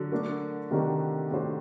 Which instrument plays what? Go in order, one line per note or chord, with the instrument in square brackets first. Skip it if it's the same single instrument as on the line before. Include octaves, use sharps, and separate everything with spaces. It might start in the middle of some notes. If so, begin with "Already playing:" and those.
Already playing: [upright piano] D3 F#3
[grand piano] A3 D4 F#4 A#4
[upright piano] C3 D#3 [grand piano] A3 D4 F#4 A#4
[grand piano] A2 A3 D4 F#4 C5